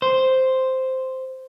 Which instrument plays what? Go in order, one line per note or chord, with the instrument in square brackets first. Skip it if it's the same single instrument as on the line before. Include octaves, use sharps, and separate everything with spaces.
[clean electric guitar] C5